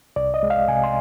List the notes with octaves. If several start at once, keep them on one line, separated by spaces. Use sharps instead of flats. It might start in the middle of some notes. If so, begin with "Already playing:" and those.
C2 D5
D#5
G#3
F5
C3 G#5
C6